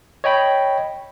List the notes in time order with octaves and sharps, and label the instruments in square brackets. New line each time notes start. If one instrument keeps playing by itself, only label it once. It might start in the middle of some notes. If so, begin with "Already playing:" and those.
[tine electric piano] C#5 D#5 G5 B5